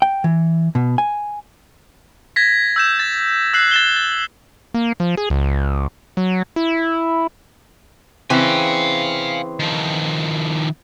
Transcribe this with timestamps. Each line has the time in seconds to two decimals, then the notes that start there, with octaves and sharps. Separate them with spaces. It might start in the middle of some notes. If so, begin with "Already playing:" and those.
0.02 G5
0.24 E3
0.75 B2
0.98 G#5
2.36 G#6 A#6 B6
2.76 E6 G6 E7
2.99 A6
3.53 E6 F#6 C7 F#7
3.71 A6 E7 G7
3.96 A6
4.74 A#3
5.00 F3
5.17 G#4
5.30 C#2
6.17 F#3
6.56 E4
8.30 C#3 E3 C4 F5 G#5
9.60 D#3 F3